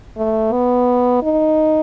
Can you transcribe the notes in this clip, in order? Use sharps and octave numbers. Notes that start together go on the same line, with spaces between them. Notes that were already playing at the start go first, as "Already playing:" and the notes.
A3
B3
D#4